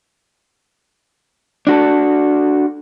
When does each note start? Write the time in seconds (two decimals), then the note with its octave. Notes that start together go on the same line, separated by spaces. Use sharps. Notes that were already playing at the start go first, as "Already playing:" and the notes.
1.67 D4 F#4 A4